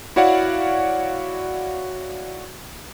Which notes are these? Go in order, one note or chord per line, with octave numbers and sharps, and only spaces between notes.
E4 F#4 C#5 D5 F5 F#5